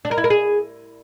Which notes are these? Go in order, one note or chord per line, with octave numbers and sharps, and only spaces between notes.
D4
A#4
E4
A#4
G#4